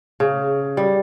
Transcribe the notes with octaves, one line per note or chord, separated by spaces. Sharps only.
C#3
G3